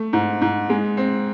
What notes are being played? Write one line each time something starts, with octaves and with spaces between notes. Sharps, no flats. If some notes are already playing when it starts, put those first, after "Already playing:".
Already playing: A3
G#2
G#2
G#3
C4